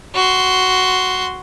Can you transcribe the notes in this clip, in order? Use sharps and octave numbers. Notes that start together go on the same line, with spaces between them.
F#4 C6